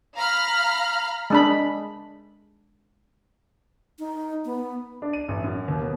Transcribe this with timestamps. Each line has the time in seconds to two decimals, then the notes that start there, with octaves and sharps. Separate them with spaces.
0.15 F5 A#5 B5 F6
1.30 G#3 D4 B5
3.99 D#4
4.45 B3
5.02 D4
5.13 D#7
5.28 A1
5.44 F#2
5.68 D#2
5.81 B2